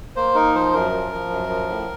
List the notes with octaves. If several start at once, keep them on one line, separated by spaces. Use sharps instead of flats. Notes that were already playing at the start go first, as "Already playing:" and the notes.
A#3 C5
D#4 A#4
F3 C5
F#2 A#4
F3
F3
F#2
F3
A2